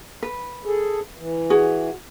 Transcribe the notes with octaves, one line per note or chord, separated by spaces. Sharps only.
B4
G#4 A4
E3
F#4 G#4